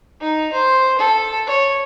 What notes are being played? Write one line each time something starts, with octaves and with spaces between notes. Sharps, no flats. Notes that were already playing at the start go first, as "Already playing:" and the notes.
D#4
C5
A4
C#5